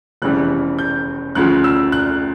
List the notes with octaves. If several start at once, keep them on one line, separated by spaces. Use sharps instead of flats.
F1 E2 C#3 E3 G3 F#6
G6
D2 C#3 F3 F#6
E6
F#6